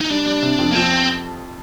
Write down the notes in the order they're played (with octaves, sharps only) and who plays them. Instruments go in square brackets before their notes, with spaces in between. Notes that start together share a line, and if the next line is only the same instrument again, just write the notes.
[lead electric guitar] D#4
[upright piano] G3 [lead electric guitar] D4
[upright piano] G3
C3
F2
[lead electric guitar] A#3
[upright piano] F3 [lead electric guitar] C4